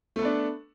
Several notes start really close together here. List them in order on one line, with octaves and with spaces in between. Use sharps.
A3 A4 B3 D4